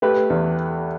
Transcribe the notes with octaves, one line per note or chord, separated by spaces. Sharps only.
A3 G4 B4
E2